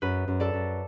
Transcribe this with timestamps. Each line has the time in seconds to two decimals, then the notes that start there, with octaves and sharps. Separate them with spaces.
0.02 F#2 B4
0.28 F#2
0.40 A4 D5
0.54 F#2